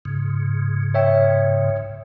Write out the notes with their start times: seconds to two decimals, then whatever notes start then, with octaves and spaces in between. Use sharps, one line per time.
0.05 G#2 C#3
0.94 C#5 E5 G5